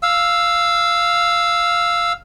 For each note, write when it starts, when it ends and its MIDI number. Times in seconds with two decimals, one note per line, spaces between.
0.03 2.13 77
0.03 2.13 88